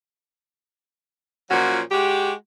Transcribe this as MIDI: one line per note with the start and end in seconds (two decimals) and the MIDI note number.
1.51 1.81 46
1.51 1.81 53
1.51 1.81 54
1.51 1.81 61
1.51 1.81 66
1.91 2.32 56
1.91 2.32 66
1.91 2.32 67